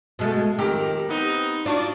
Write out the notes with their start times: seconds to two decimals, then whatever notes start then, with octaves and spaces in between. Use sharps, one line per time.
0.19 B2 G#3 A3
0.59 F2 D#3 G4 A#4
1.09 B3 C4 D#4
1.66 D4 F4 F#4 D5